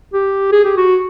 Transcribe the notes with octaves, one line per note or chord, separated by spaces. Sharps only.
G4
G#4
G4
F#4